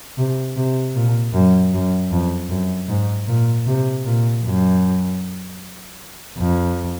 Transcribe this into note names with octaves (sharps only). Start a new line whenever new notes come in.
C3
C3
A#2
F#2
F#2
F2
F#2
G#2
A#2
C3
A#2
F#2
F2